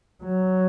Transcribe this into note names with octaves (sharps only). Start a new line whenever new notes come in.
F#3